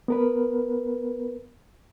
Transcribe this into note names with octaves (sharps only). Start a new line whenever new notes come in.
B3 A#4 B4